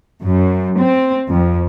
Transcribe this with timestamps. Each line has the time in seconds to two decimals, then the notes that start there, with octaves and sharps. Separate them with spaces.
0.24 F#2
0.80 C4
1.31 F2